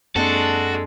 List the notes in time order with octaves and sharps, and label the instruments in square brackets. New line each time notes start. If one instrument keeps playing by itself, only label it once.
[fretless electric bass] F#2 A#3 C4 [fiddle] G#3 D4 [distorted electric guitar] F#4 [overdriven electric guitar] A4